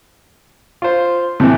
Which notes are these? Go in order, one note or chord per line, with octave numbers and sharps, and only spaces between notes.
F4 C5
A2 C3 E3